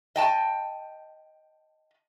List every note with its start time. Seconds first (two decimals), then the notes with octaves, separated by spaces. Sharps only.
0.16 D#5 G5 A5